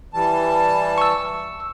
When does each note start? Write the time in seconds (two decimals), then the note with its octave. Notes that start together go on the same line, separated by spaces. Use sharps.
0.14 E3 G3 A5
0.98 C#6 E6